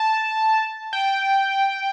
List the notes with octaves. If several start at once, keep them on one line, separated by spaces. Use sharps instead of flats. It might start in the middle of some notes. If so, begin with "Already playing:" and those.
Already playing: A5
G5